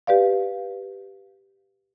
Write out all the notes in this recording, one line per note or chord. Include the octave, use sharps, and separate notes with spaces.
G4 B4 D5 F5